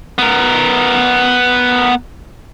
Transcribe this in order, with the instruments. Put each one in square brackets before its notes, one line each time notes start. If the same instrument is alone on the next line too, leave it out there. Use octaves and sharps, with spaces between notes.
[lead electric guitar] B3 A#4